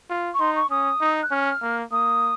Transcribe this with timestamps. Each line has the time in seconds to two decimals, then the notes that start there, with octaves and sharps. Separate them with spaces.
0.10 F4
0.34 C#6
0.39 D#4 C6
0.55 C#6
0.70 C#4 D#6
1.00 D#4
1.22 F#6
1.31 C#4 F6
1.62 A#3
1.91 A#3 D#6